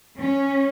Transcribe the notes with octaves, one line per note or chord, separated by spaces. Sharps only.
C#4